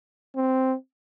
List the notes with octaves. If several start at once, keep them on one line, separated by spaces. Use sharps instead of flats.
C4